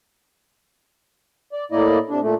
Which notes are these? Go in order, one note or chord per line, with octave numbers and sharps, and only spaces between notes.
D5
A2 A#3 E4 D5 D#5
C3 D4
A#2 A3